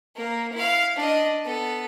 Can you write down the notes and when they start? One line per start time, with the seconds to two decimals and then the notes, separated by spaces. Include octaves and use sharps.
0.16 A#3 A#4
0.53 E4 F5
0.96 D4 D#5
1.45 B3 A4